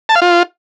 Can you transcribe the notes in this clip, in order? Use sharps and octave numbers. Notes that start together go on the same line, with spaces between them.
A5
F5
F4